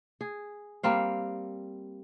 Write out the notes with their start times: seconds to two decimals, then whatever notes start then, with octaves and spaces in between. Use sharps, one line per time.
0.21 G#4
0.83 G3 A#3 C4 F5